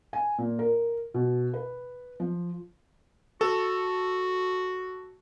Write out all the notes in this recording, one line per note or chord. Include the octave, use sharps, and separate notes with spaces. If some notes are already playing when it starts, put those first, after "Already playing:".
G#5
A#2
A#4
B2
B4
F3
F#4 A4